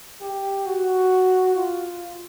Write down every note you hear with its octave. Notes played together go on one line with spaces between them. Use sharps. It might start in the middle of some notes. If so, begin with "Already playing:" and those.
G4
F#4
F4